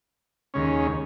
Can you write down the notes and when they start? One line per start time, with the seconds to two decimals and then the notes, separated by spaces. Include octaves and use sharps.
0.54 D#2 C#3 G#3 C#4